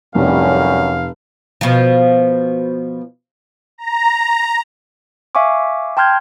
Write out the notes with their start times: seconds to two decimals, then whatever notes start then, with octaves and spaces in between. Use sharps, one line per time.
0.15 F1 F#2 A2 G3 C#4 F5
1.61 B2 F3
3.78 A#5
5.35 E5 F5 G#5 C#6 D6
5.97 G5 A5 C6 F6 G6 G#6